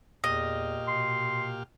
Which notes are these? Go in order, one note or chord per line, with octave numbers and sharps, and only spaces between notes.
E2 A#2 G4 D#5 F6
B2 C6